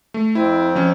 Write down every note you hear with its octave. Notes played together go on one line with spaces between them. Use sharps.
A3
F2 C4 E4
F3 C#4